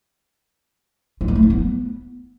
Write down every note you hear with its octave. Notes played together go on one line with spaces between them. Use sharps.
F4
B3
A3
E4
B3